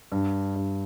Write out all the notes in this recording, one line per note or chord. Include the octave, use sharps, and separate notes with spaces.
G2
G2